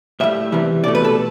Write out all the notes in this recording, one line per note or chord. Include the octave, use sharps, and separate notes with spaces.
A2 G3 E5
E2 C3 E3 G3
C2 B2 A3 D5
B4
A4